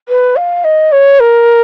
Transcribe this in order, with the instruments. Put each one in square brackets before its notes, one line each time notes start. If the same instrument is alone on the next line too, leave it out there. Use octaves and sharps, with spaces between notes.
[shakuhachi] B4
F5
D#5
C#5
A#4